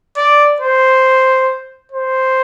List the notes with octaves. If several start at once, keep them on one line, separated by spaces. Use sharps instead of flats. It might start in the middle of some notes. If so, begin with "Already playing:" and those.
D5
C5
C5